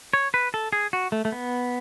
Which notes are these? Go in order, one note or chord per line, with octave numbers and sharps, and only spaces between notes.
C#5
B4
A4
G#4
F#4
A3
A3
B3